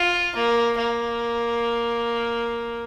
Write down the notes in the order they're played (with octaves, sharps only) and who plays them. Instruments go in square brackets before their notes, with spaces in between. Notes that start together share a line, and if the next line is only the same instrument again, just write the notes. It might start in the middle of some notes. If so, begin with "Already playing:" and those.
Already playing: [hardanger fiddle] F4
A#3
A#3